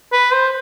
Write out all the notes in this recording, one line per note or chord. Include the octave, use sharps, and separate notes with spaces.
B4
C5